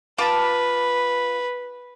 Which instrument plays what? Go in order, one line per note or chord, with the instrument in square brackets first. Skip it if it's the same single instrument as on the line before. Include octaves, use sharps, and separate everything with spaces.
[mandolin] F4 A5 D6 [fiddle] B4